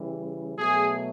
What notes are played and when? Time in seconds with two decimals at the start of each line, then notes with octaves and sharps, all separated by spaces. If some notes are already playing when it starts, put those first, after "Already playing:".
Already playing: C#3 E3 G3
0.58 B2 F#3 A3 G#4